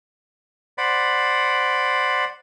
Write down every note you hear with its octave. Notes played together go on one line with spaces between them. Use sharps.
C5 D5 F#5 B5